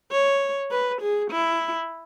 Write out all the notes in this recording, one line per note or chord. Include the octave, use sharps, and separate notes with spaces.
C#5
B4
G#4
E4